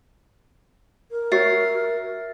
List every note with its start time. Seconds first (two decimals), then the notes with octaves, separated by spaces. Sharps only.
1.11 A#4
1.32 F#4 C#5 E5 A6 C7